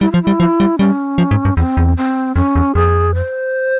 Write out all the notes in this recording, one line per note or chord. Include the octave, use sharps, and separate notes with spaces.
G3 E4
F3 F4
G3 E4
F3
G3
G3 C#4
F3
G#2
G2
E2 C4
E2
C4
F2 C#4
E2
F2 G#4
C5